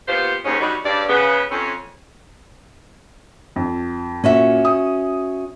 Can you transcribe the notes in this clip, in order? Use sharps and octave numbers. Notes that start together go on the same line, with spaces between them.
A#2 B3 F4 G4 C5
D#2 G#2 C#4
F#3 G3 B3 C#4 D#4 F#4
G2 C#3 D5
C#3 B3
F2 C4 C#4
F2
A#2 C#4 F#4 E5
D#6